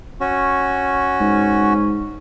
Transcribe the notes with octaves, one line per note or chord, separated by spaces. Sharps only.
C#4 F#4
G#2